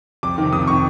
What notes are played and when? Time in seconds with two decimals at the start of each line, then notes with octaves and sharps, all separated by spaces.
0.23 F2 D6
0.38 C3 D#3
0.53 F2 D#6
0.67 C3 D#3 C#6